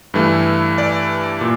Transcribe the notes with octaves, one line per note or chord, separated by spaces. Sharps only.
G2 E3 A3
D5
A#2